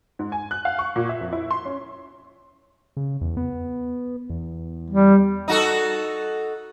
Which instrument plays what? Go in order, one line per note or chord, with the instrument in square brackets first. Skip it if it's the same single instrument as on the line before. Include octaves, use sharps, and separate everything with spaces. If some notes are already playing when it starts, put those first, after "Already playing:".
[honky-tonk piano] G#2
G#5
F#6
F5
C#6
A#2
E5
F2
E4
C6
C#4
[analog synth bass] C#3
E2
B3
E2
[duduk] G3
[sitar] D#4 F#4 A4